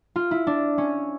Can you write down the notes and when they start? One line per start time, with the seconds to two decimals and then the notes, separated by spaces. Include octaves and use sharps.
0.16 F4
0.31 E4
0.47 D4
0.78 C#4